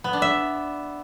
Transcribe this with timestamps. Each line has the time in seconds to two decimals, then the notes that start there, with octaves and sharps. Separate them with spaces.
0.04 B3
0.13 D4
0.22 E5